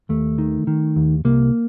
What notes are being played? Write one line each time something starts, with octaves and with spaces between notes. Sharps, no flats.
D#2 A3
D#3
D#3
D#2
C2 A#3